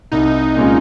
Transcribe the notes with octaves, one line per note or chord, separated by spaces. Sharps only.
C2 D#4
A#2 G#3 C#4 F4